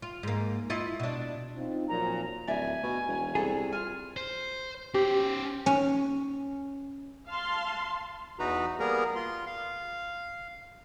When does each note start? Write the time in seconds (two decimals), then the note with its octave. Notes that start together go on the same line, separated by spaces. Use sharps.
0.02 F4
0.23 G#2 A#3
0.70 E4 F4 D#5
1.00 B2 D4
1.56 C4 D#4 F4
1.89 A#2 F3 F#3 A#5
2.47 D1 D5 E5 G#5
2.83 B2
3.08 E1
3.35 C2 G#4 A4
3.72 F4 G#5 F6
4.17 C5
4.94 C#4 G4 C5
5.66 C#4
7.29 F5 A5 C6
8.39 E2 E3 D#4 F#4 B4 A#5
8.80 G3 A#3 B3 G#4 A#4 A#5
9.15 F4 C6
9.46 F5